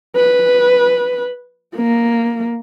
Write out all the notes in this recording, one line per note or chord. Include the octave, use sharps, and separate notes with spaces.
B4
A#3